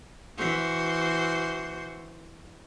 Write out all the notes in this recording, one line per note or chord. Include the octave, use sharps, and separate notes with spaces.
E3 F#4 C5